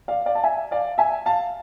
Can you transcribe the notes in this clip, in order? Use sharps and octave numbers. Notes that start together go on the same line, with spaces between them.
D5 F5
D5 F5
A5
E5 G#5
D5 F5
E5 G#5
F5 A5